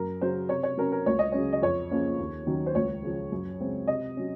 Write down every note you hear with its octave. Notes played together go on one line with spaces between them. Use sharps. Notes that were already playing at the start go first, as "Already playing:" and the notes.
Already playing: F#2 A#4
C#3 F#3 C#4 C5
C3 C#5
C#5
F#3 C#4 A#4
A#4
C#2 C#5
D#5
C#3 F#3 C#4 C#5
D#5
F2 C#5
C#3 F3 A#3 C#4
D#2
D#3 F#3 C#4
C5
C#2 C#5
C#3 F3
F#2
C#3 G#3 C4
C3 D#5
F#3 C#4